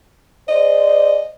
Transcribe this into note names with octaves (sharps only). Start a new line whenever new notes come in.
G#4 C5 D5 D#5